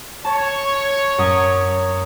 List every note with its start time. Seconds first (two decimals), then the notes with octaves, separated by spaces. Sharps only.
0.25 C#5 A5
1.18 F#2 D#6